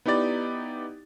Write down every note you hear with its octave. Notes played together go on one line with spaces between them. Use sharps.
B3 D#4 E4 G4 D5 A6